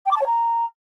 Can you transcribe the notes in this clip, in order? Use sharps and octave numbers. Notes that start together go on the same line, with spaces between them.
G5
D6
A5
C#5
A#5